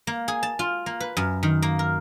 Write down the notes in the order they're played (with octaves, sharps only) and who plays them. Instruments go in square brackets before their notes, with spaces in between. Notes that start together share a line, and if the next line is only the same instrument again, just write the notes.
[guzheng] A#3
G#4
A5
F4
A#3
B4
F#2
D#3
A#3
A#4